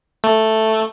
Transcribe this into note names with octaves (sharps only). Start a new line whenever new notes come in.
A3